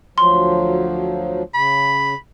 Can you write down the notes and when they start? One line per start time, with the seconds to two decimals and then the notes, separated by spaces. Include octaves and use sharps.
0.18 D2 F3 F#3 C6
1.54 C#3 B5